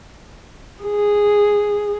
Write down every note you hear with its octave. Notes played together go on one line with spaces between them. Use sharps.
G#4